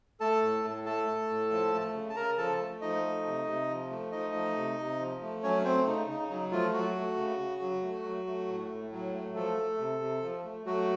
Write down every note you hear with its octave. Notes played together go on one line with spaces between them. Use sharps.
A3 A4 A5
A2
A2
A3 A4 A5
A3
A2
F3
A3
C#3
A5
C#3 A#4 A#5
F3 A4 A5
A3
F3 D#4 D#5
A3
C3
C3
F3
A3
F3 D#4 D#5
A3
C3
C3
F3
A3
F#3 C#4 C#5
A3 C4 C5
C#3 D#4
C#3 D#4
F#3 D#4
F3 A3 F4
F#3 F#4
A3
C#3
C#3
F#3
A3
F#3
A3
A2
A2
F#3
A3
F3 A3 A4
A3
C3
C3
F3
A3
F#3 A3 F#4